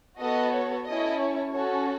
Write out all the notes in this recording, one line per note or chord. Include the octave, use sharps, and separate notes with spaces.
B3 F#4 A4 D#5
C#5
C#4 E4 A4 D#5
C#5
C#4 F#4 A4 C#5